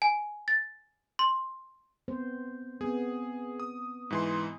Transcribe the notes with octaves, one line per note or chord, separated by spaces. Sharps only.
G#5
A6
C6
B3 C4 C5
B3 C4 G#4
D#6
G#2 E3 C6